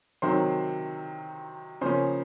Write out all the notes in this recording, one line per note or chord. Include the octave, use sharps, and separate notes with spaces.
C3 D#3 F#3 C4 C5 C6
C#3 F3 A#3 C#4 C5 C6